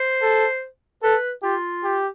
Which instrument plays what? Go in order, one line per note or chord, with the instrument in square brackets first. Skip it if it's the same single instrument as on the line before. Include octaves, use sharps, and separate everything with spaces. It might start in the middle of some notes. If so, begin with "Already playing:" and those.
Already playing: [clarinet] C5
[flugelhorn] A4
[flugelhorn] A4 [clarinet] B4
[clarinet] F4 [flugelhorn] G4
[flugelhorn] G4